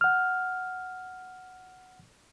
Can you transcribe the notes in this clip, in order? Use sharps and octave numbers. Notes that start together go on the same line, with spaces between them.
F#5 F6